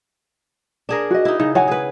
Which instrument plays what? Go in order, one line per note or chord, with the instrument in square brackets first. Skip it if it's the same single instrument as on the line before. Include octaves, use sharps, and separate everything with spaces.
[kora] D4 G#4 A#4
[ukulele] F#4 D#5
[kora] D#4 E4
[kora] C#3 [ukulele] D#4
[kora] F#3 [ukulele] C#5 F#5 G#5
[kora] G#4 B4